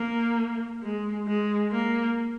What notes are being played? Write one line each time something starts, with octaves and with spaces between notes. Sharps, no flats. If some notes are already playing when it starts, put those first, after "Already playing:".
Already playing: A#3
G#3
G#3
A#3